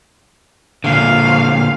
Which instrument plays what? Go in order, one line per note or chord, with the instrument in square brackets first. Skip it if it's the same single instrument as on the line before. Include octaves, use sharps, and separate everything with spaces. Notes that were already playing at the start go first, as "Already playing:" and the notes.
[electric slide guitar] A#2 D3 [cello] F5